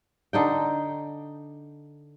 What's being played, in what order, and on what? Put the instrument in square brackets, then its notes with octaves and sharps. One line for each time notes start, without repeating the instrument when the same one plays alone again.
[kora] D3 D#4 G5